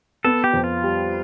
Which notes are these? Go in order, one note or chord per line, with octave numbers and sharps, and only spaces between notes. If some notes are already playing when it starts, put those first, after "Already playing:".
B3 A4
G4
F2
F4
G3